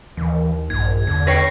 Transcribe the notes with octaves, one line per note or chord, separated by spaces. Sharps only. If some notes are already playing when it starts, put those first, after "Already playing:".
D#2 E3
A#1 G2 G#6
E2 D3
B4 C#5 G5 A#6 C7